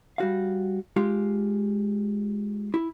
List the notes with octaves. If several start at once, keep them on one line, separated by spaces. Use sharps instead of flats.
G3 F#4 F5
G#3 F4 G4
E4